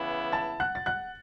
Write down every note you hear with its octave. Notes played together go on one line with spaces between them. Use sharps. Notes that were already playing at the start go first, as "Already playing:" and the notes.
Already playing: C#3 E3 B3 E4
A5 A6
F#5 F#6
A6
F#5 F#6